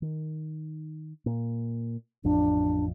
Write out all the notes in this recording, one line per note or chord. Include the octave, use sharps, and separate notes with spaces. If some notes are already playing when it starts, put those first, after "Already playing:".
D#3
A#2
A1 F2 D4